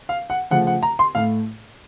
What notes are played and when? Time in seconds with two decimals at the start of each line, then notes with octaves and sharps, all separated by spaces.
0.09 F5
0.30 F#5
0.51 C#3 F3 A3 F#5
0.67 F#5
0.83 A#5
0.99 C6
1.15 A2 A3 F5